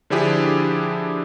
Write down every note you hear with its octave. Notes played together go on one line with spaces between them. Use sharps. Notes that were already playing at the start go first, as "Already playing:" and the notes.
D3 F3 D4 E4 G4 G#4